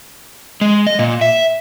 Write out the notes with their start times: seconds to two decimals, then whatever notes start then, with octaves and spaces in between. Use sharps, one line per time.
0.61 G#3
0.87 D#5
0.99 A#2
1.21 E5